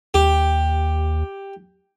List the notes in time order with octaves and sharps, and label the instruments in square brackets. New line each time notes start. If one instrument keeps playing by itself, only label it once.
[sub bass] D#2 [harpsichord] G4